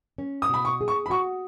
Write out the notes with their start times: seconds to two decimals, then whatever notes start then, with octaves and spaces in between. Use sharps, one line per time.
0.18 C#4
0.42 D#6
0.49 B2 B5
0.65 C#6
0.81 G#4
0.88 C#6
1.06 B5
1.10 F#4 C#6